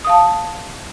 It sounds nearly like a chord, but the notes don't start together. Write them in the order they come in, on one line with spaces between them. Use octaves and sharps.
D#6 F5 A5